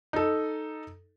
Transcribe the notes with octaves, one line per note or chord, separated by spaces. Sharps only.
D#4 A4